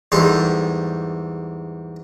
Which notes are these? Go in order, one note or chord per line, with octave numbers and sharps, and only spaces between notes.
E2 G#2 G3 A4